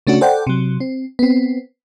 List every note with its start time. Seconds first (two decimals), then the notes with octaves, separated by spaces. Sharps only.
0.07 C#3 A3 C#4 D4 F#4
0.21 A4 C5 D5 F#5 G5
0.47 C3 F#3
0.80 C4
1.19 B3 C4